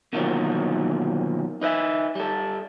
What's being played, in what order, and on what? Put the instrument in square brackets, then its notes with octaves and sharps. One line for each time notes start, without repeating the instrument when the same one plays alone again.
[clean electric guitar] B2 D3 D#3 F3 F#3 A#3
D#4 B4 E5
G3 A4